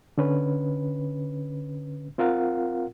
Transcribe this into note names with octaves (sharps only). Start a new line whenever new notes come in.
D3 C#4 B4
C4 F4 A#4 F5 F#5